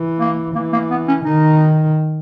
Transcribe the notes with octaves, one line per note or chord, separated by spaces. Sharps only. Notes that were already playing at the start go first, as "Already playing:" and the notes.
Already playing: E3
A#3
E3 A#3
A#3
B3
C#4
D#3 D#4